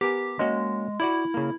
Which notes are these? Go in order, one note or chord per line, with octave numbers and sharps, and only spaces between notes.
B3 G4 A#4 G#5
G#3 A#3 C#4 F#4
E4 F#4 D5 E5
C#3 A#3